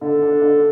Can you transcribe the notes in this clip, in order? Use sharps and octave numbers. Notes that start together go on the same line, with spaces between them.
D3 A4
D4
D3